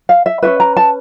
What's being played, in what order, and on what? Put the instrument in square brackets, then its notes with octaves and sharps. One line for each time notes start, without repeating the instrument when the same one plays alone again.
[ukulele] F5
E5
C#4 F#4 B4 E5
A#5
A5